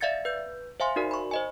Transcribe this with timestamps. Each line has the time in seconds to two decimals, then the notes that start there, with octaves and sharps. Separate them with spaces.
0.01 D5 E5 F5 G#6 A6 C#7
0.25 B4 G6
0.80 C5 E5 F5 G#5 C6
0.96 D#4 F#4 A#4 D5
1.11 B5 C#6
1.31 C5 D#5 G#5